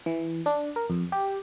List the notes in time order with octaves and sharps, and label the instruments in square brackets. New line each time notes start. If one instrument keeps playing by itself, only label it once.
[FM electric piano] E3
D4
A#4
F2
G4